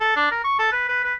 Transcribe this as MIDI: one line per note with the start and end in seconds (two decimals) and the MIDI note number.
0.01 0.15 69
0.16 0.28 62
0.31 0.44 70
0.44 0.58 85
0.59 0.70 69
0.72 0.84 71
0.88 1.03 71
1.04 1.14 71